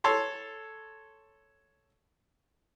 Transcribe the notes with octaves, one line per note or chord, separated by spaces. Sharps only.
A4 C#5 C6